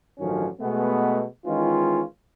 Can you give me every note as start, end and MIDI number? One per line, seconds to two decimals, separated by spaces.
0.19 0.46 33
0.19 0.46 43
0.19 0.46 51
0.19 0.46 53
0.19 0.46 54
0.19 0.46 61
0.61 1.24 47
0.61 1.24 56
0.61 1.24 57
0.61 1.24 59
1.46 2.02 51
1.46 2.02 52
1.46 2.02 56
1.46 2.02 61
1.46 2.02 65